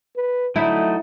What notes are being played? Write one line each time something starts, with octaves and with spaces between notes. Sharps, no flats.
B4
D3 F#3 A3 D#4 E4